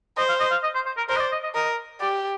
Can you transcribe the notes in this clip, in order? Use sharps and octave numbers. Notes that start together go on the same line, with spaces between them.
C5 D#5
F5
D#5
F5
D#5
C5
C5
A#4
A#4 C5
D#5
D5
D#5
D#5
A#4 D#5
G4 D5